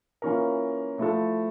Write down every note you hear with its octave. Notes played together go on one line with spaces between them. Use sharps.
E3 A#3 C#4 F4 A#4
F3 A3 E4 A4